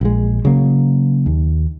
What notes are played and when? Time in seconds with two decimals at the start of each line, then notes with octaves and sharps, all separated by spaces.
0.01 A#1 G#3
0.45 C#3 F#3 A#3
1.26 D#2